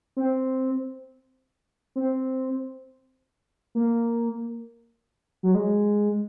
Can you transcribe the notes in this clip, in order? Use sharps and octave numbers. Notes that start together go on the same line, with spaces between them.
C4
C4
A#3
F#3
G#3